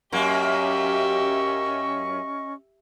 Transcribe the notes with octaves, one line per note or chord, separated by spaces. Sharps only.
F#2 A#3 C#4 G4 D#5 E5 C#6